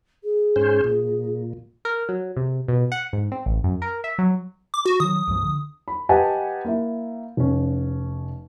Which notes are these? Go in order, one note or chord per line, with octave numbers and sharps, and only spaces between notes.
G#4
G#2 C#4 C5
A#2
A#4
F#3
C3
B2
F#5
G#2
C4
A1
F#2
A#4
E5
F#3
D6
F#4
D#3 F#3 D#6
C#2 G2 F3
D3
B5
G4 B4 D#5 F#5 G#5 A5
A#3 E4
F1 C#4